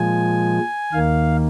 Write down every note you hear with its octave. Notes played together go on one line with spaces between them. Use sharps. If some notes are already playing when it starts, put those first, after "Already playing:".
Already playing: A#2 F3 G#3 G#5
D#2 D#3 A#3 F5